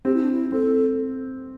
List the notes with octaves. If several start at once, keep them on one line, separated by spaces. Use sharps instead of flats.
C4 G4
E4
D4
E4
C4 A4